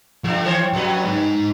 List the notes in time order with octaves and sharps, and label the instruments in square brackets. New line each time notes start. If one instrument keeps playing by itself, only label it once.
[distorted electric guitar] F3 [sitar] G3 A3 D4
[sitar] D#3 C5 C#5
[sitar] F2 G3 B4 [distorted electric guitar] F#3
[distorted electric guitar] G#3 D#4